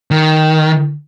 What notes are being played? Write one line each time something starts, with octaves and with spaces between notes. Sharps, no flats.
D#3